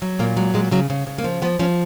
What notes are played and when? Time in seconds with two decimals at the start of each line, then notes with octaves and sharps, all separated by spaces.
0.02 F#3
0.19 A#2 A#3
0.37 F#3 G#3
0.54 A#2 G#3
0.71 C#3 F#3
0.90 C#3
1.07 C#3
1.18 A#3
1.24 F3
1.42 F3 B3
1.59 F3 C#4